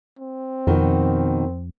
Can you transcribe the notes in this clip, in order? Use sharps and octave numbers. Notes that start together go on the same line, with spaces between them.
C4
F2 B2 D#3